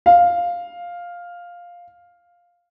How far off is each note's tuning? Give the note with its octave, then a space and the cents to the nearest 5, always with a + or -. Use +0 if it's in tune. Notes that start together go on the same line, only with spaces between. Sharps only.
F5 +5